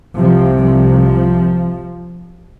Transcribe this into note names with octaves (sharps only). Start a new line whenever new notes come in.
C2 C3 F3
F3